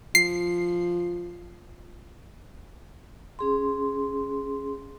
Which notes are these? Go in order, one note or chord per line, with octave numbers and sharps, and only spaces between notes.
F3 C7
C#4 G#4 C6